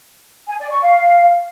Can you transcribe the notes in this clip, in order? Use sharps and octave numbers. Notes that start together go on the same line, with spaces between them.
G#5
D5
C#6
F5